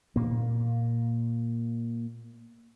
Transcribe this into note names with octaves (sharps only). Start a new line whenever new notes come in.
A#2 A#3